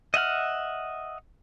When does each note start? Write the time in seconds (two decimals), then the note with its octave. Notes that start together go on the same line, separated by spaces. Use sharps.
0.14 D#5 E5 F#5 F6